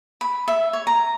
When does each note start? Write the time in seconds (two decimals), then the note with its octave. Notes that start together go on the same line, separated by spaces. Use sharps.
0.21 B5
0.48 E5
0.73 C#5
0.87 A#5